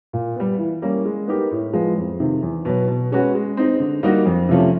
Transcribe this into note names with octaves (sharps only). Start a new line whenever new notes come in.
A#2
G3 B3
E3
G3 A#3 C#4
G#3
B3 D#4 G4 A#4
A2
F3 G#3 B3
F2
C3 D#3
E2
B2 F#3 B3
B2
G#3 C#4 F#4 B4
G#3
C4 D#4
D3
G3 A#3 D#4 F#4
F2
C3 F3 A3 C#4